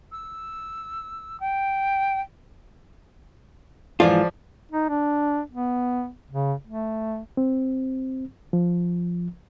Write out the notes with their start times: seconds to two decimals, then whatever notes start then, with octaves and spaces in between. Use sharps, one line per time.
0.12 E6
1.40 G5
4.00 G#2 E3 F3 F4 D5
4.72 D#4
4.89 D4
5.50 B3
6.31 C#3
6.67 A3
7.37 C4
8.53 F3